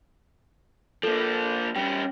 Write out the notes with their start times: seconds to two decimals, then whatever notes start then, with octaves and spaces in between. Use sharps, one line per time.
1.03 F3 A#3 A4
1.76 G3 C#4 G5